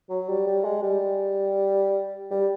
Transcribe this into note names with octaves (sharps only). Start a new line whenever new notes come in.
F#3
G3
G3
G#3
G3
G3